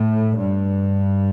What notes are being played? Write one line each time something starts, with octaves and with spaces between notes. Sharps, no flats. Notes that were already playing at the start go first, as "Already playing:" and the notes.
Already playing: A2
G2